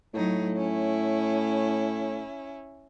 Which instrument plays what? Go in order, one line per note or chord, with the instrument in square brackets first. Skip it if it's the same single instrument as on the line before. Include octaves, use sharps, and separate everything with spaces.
[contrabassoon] A2 [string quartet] F#3 D#4
[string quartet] C#4 E4